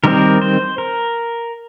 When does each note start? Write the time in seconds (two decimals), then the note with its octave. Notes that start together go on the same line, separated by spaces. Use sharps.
0.04 D#3 G3 C4 A#4
0.42 C5
0.78 A#4